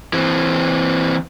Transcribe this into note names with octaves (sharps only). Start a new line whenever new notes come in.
E3 C4